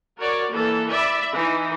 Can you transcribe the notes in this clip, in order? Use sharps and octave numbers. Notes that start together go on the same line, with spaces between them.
F#4 A#4 C#5 D5
E3 A#3 A4
D5 E5 B5
E3 D#4